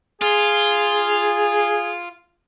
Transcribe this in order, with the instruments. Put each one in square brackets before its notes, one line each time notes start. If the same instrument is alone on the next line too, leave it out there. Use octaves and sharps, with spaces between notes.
[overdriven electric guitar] F4 [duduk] G#4